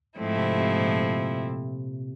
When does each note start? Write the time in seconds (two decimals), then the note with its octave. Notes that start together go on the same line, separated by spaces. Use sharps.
0.17 G#2 F3 A3 C4 E4
0.37 C3
0.58 C3
0.78 A#2